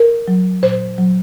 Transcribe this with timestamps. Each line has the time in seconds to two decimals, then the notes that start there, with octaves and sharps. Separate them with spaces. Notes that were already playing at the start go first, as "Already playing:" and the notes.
Already playing: A#4
0.28 F#3
0.63 A#2 C5
0.98 F#3